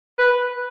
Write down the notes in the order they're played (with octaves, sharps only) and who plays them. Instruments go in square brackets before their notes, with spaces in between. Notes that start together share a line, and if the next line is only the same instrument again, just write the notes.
[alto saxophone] B4